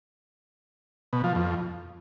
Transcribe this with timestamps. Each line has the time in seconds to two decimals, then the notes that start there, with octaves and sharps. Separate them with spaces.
1.13 B2
1.24 F3
1.35 F2